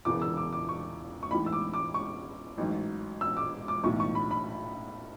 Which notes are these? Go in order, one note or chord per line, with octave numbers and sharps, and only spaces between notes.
E1 E2 C#3 E3 D6
E6
D6
D6
C#6
C#6
A1 G#2 E3 B5
E6
D6
D6
C#6
A1 G#2 F#3
E6
D6
D6
B1 A2 E3 C#6
C#6
B5
B5